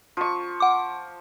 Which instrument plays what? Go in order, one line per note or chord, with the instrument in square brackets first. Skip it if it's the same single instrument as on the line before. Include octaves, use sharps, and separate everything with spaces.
[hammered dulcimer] F3 C#6
[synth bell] F#5 D6